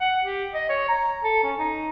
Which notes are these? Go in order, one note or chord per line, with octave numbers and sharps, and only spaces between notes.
F#5
G4
D#5
C#5
A#5
A4
C#4
D#4